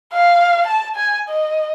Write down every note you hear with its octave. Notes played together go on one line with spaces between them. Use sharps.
F5
A5
G#5
D#5